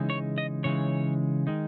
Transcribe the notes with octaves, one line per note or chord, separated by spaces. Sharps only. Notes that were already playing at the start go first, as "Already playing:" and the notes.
Already playing: C#3 E3 G#3 D#4
C#5
D#5
C#3 E3 G#3 D#4 C#5
D#3 G#3 D#4